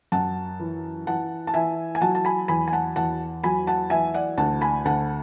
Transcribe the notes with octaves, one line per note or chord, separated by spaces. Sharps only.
F#2 F#5 A5
E3
E3 F#5 A5
A5
E3 E5 G#5
G#5
F#3 F#5 A5
A5
G#5 B5
E2 G#5 B5
G#5
F#5 A5
E2 F#5 A5
F#3 G#5 B5
F#5 A5
E3 E5 G#5
D5 F#5
D2 F#5 A5
G#5 B5
D2 F#5 A5